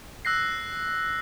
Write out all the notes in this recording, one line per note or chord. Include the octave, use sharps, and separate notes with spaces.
E6 F#6 A#6 C7